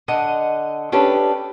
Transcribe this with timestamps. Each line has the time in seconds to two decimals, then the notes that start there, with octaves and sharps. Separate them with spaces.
0.08 D3 D#5 F#5
0.92 C#4 D4 G4 A4 B4